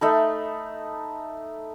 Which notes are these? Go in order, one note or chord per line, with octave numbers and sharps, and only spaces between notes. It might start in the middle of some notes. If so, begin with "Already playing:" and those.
A3 D#4 B5